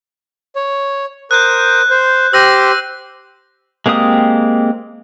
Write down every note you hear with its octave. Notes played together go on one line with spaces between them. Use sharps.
C#5
A#4 C5 D#6 F#6 G6
C5
G4 C5 E6 A#6 D#7
G#3 A#3 C4 G4 D#6